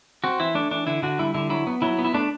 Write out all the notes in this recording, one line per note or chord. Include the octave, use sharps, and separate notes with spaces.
C4 F#4
E3 E4
A3 D4
E3 D4
D3 E4
D3 F#4
G3 E4
D3 E4
F#3 E4
B3
F#3 E4
B3
E4
A3 D4